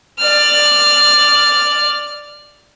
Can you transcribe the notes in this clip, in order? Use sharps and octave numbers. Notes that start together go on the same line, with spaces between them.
D5 F6